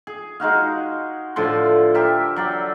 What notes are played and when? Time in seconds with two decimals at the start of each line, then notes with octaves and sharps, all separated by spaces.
0.07 G#4
0.40 G#3 D#4 F#4 F5
1.36 A2 D3 F3 C6
1.94 G4 A#4 E5
2.36 F#3 D5 G5